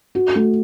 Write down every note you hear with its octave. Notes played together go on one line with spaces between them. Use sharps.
F#4
A3